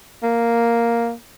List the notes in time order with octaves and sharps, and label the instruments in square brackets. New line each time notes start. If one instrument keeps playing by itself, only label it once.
[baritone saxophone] A#3